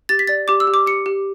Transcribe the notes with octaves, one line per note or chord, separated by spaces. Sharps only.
G4 A6
B6
D5 A6
G4 D6
E6
G4
D6
G4 C#7
G4